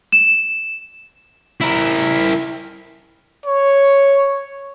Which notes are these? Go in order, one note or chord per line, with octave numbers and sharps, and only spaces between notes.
E7
E4 A#4
C#5